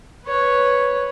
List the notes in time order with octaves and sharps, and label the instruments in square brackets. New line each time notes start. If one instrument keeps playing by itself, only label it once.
[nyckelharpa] B4 C#5